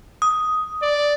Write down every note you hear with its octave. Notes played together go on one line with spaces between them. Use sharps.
D#6
D5